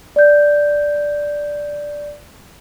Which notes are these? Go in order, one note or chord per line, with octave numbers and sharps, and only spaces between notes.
D5 G6